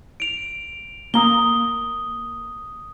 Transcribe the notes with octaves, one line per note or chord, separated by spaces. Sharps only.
D7 F7
A#3 A#5 D#6 G7